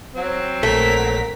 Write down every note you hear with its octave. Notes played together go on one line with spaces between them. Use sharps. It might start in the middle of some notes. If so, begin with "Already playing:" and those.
F#3 C4
A#1 A3 A#4 B6